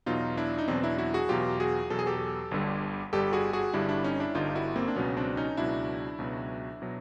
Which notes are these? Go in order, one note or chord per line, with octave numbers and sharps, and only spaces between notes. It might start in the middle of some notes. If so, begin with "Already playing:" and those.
E2 B2 F#3 D#4 F4
D4 E4
D#4
E2 B2 F#3 C4 D4
D4 E4
E4 F#4
F#4 G#4
E2 B2 F#3 F4 G4
F#4 G#4
E2 B2 F#3 A4
G#4
G4 A4
G1 G2 D3 G3
G1 G2 D3 G3 G4 A4
F#4 G#4
F#4 G#4
G1 G2 D3 G3 D4 E4
D4 E4
C#4 D#4
D4 E4
G1 G2 D3 G3 D#4 F4
E4 F#4
A#3 C4
D4
C#2 B2 F#3 B3 C#4
C4 D4
C#4 D#4
C#2 B2 F#3 D4 E4
C#2 B2 F#3
B2 F#3